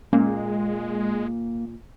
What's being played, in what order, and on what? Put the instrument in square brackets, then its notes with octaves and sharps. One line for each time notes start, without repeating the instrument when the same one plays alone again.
[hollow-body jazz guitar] A#2 [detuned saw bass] G#3 [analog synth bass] A#3 [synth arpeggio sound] C#4